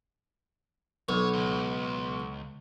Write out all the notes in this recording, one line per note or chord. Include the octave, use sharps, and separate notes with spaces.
B1 C#5
C#2